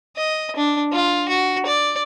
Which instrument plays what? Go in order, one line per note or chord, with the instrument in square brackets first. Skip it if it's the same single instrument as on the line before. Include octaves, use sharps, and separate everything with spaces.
[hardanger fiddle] D#5
D4
F4
F#4
D5